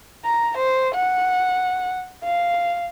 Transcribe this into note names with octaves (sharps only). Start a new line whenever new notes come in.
A#5
C5
F#5
F5